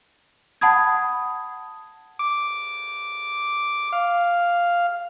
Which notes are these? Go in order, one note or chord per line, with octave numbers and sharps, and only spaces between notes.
F#5 A5 B5 D#6 G#6
D6
F5